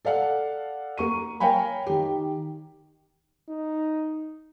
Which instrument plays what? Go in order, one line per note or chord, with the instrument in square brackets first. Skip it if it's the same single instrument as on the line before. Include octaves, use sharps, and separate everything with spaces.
[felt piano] A4 D5 F5 F#5
A#3 C#6 D#7
A#4 C#5 F5 G5 G#5 B5
D#3 G4
[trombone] D#4